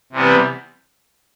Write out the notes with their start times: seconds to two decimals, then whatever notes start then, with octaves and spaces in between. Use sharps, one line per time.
0.12 C3 E3 G3 B3